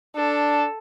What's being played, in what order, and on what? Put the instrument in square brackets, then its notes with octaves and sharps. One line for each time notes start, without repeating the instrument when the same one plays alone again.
[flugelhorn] D4 [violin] A4